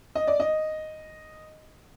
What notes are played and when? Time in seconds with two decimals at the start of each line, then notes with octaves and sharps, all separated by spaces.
0.15 D#5
0.27 D5
0.40 D#5